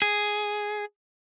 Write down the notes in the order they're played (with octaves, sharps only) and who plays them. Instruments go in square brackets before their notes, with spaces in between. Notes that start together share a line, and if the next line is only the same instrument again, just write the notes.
[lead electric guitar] G#4